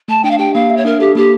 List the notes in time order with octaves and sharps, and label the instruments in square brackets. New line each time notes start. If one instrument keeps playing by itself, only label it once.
[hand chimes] A3 [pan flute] A5
[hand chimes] D4 [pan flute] G5
[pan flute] F5
[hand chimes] G4 [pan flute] G5
[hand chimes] A#3 [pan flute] F5
[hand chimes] E5
[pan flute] C#5
[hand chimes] D4 [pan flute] A#4
[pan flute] G4 [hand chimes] A4
[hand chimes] A#3 [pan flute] G4